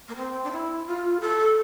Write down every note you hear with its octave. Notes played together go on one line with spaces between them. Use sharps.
A#3
C4
D4
E4
F4
A4